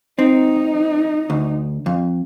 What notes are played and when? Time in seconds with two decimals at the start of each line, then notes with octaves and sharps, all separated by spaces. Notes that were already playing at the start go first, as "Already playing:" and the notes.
0.19 C4 D#4
1.30 D2
1.86 F2